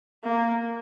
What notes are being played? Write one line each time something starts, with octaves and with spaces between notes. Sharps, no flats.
A#3